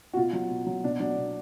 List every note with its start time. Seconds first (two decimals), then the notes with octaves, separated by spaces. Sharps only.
0.14 F#4
0.17 B2 F4
0.33 F#3
0.51 B2
0.66 F#3
0.84 B2 D4
1.00 F#3 D4
1.17 B2